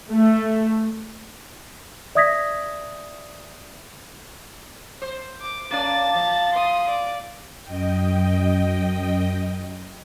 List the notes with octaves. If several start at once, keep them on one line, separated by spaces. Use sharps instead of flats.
A3
D5 E5 D#6 G#6 A#6 B6
C5
D6
A#3 C#4 D5 A5 A6
F3
C6 D#6
D5
F#2 D#5 G5